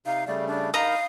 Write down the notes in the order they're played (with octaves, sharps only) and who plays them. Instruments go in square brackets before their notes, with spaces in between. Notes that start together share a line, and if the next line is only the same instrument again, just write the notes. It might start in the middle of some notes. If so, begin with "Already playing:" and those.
[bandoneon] C3 D#4 [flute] F5
[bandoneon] C#3 G3 A3 [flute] D5
[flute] D4
[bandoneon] D#4 A#4 B5 [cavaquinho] D#5 A#5 [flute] F5